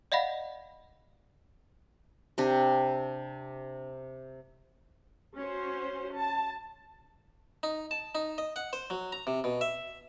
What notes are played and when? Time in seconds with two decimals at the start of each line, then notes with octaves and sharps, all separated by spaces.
0.12 D5 D#5 F5 F#5 B5 A#6
2.38 C3 D4 G4
5.39 C#4 F#4 C5
6.16 A5
7.63 D#4
7.91 A5
8.15 D#4
8.38 D#5
8.56 F#5
8.73 C5
8.90 F#3
9.12 A#5
9.27 C3
9.44 B2
9.61 E5